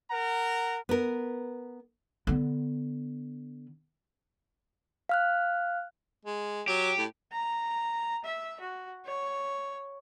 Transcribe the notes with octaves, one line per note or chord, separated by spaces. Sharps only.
A#4 F#5 A#5
B3 A#4
D3 B3
F5 F6 F#6
G#3
F#3 G4
A2
A#5
E5
F#4
C#5